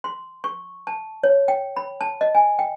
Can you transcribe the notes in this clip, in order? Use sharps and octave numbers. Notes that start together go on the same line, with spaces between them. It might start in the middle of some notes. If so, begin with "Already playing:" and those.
C6
C#6
A5
C#5
G5
B5
A5
D#5
G#5
G5